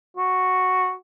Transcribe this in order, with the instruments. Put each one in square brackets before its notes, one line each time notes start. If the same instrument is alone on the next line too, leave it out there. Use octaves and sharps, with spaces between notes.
[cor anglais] F#4